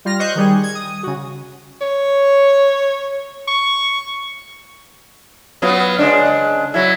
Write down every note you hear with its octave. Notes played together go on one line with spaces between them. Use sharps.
G3 F4 F6 A#6
C5 D#5 C#6 F#6 G6
D#3 G3 G#4
G#6
D#6
C#3 F#4
C#5
C#6
F#3 B3 F4
C#3 G#3 D4
F#3 E4